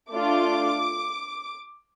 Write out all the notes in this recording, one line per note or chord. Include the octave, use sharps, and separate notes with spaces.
A3 D4 F4 D6